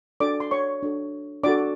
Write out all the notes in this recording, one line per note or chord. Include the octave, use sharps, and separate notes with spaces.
D4 F#4 A4 D5 D6
C6
C#5 C#6
D4 F#4 A4
D4 F#4 A4 D5 D6